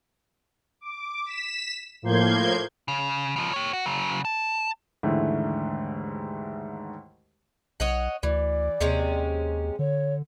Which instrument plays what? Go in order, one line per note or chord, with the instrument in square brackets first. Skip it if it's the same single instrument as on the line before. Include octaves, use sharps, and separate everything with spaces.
[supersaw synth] D6
B6 E7
A2 F3 A#3 C6 G6 G#6
[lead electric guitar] C#3
C#3 F3
G4 C#5
F#4
C#3 F#3
A5
[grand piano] D#2 G#2 D3 E3 A3
[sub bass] B1 [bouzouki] C#5 D#5 F#5
[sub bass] D2 [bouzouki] E3 [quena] D5
[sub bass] D#2 [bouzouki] C3 G#3 C#4
[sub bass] D3 [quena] C#5